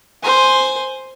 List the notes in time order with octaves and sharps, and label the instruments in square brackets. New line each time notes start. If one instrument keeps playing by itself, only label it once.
[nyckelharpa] C5 G#5